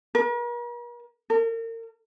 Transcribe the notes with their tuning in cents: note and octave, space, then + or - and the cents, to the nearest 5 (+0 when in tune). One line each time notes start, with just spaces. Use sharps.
A#4 +45
A#4 -35